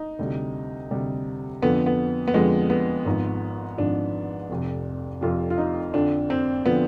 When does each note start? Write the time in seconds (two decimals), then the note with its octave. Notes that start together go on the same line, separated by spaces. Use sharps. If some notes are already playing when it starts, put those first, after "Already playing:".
Already playing: D#4
0.19 D2 C3 G3
0.91 D2 C3 G3
1.62 F2 D3 F3 B3
1.86 B3
2.28 B3
2.34 F2 D3 F3 G#3
2.70 B3
3.06 G#1 G#2 F3
3.78 G#1 G#2 F3 D4
4.50 F1 F2 C3
5.21 F1 F2 C3 F4
5.50 F4
5.58 D#4
5.94 F2 D3 F3 D4
6.30 C4
6.66 D3 F3 B3